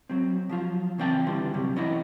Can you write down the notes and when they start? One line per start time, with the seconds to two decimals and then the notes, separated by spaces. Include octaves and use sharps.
0.10 F#3 C4
0.49 F3 F#3 F4
0.98 C#3 E3 C4 D5 G5 A5
1.26 G2 D3 E3 G3 C6
1.54 G2 C3 F#3 G3
1.76 E3 C#4 E4 D5 D#5